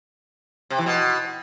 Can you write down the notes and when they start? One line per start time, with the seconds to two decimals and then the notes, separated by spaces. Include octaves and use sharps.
0.70 C3
0.78 E3
0.86 B2